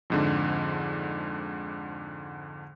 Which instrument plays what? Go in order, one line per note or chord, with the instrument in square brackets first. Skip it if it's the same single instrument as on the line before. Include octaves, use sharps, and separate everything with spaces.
[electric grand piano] F2 G#2 D3